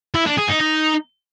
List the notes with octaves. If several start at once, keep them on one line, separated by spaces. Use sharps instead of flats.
E4
D4
G#4
D#4
D#4